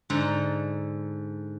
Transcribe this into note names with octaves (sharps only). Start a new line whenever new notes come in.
G#2 D3 A4 A#5